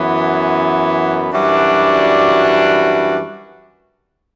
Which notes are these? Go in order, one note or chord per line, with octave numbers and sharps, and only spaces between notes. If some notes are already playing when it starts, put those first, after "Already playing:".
Already playing: F#2 E3 B3
F#2 E3 G3 D4 F#4